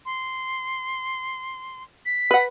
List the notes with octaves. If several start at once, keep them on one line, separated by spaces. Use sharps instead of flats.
C6
B6
B4 F#5